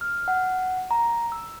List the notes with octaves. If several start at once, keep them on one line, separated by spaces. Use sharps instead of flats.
F6
F#5
A#5
E6